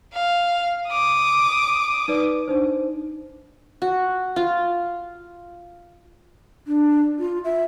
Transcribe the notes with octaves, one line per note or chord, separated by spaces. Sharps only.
F5
D6 D#6
D#4 B4 D5
D4 D#4 C5
F#4
F4
D4
F4
E5